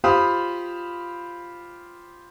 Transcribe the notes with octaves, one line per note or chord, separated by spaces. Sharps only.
F4 G4 C5 F5 B5 D#6